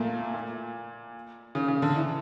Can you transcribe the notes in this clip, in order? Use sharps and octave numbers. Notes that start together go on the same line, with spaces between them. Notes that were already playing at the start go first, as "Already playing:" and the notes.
Already playing: A#2 A3 A#3
A#2
C#3
C#3
D3
E3